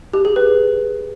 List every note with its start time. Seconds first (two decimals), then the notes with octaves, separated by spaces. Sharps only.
0.14 G4
0.25 G#4
0.36 B4